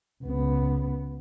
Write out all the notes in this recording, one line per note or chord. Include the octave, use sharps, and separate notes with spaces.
C#2 B3